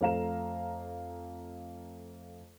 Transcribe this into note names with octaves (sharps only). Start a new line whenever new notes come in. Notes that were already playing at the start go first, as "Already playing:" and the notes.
F2 A3 F5 A#5 E7